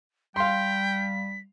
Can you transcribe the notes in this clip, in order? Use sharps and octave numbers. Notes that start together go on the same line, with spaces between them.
G3 F5 G5 C6 B6